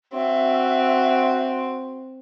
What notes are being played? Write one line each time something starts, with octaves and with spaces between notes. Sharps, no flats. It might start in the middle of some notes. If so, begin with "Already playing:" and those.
C4 F#4 E5